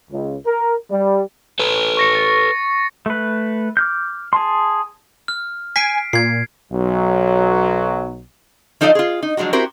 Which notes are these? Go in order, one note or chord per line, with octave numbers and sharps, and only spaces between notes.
C#2
A#4
G3
A4 B4
C#6 A#6 C#7
A6
A3 B4
D6 F6 G6
G#4 A5 C6
F6
G#5 B6 C7 D7
A#2 G#6 C7
B1 F#3
F3 D#4 A4 D5 D#5 F5
F4 G#4
D#4
F3 F#3 G#3 D4 F#4
C4 E4 F#4 G4 A#4 C5